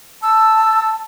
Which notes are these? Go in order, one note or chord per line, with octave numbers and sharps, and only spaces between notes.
A5 E6